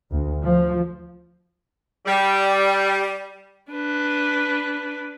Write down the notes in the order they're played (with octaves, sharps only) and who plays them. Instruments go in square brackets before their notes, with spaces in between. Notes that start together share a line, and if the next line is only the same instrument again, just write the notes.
[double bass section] D2
F3
[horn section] G3
[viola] D4 B4